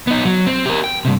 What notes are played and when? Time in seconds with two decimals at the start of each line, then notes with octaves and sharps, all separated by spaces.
0.07 B3 D#4
0.25 F#3
0.46 C4
0.66 G4 A#4
0.84 G5
1.05 G2 C3